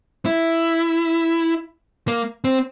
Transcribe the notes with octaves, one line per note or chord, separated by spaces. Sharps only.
E4
A#3
C4